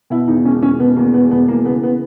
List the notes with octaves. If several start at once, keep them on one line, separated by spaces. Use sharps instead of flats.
B2 E4
E2 D#4
E1 C#4
E1 C#4
B2 B3
E2 A#3
E1 B3
E1 B3
E3 A#3
C#3 B3
B3